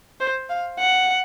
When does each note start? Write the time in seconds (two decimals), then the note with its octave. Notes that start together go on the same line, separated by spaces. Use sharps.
0.20 C5
0.50 F5
0.79 F#5